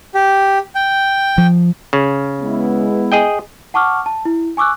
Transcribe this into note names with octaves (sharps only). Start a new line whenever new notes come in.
G4
G5
F3
C#3
G#3 B3 E4
G#4 D#5 G5
F#5 A5 C#6 D6 F6
A5
E4
G#5 C#6 D6 E6 F#6